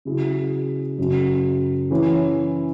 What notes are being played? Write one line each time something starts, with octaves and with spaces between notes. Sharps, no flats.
C#3 F#3 E4 G#4
F#2 C#3 F#3
E3 C#4 E4 C#5